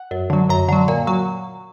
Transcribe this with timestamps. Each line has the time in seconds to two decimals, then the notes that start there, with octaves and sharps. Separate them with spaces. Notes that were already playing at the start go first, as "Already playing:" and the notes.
Already playing: F#5
0.11 F#2
0.30 D3 F#3
0.49 F#2 A#5
0.68 D3 F#3
0.88 A#2
1.07 F#3